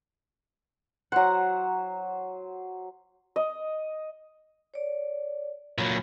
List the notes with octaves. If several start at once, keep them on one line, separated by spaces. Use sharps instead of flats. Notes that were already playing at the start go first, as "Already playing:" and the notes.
F#3 C5 F#5 A#5
D#5
C#5 D5
A#2 F#3 B5